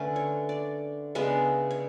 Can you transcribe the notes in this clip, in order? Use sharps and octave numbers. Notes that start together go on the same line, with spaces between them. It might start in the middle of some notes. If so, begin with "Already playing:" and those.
Already playing: D3 A3 C#4 B4
C#5
D5
C#3 G#3 B3 D4 E5
C#5